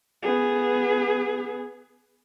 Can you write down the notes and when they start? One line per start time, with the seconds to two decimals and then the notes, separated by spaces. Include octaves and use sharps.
0.23 B3 G#4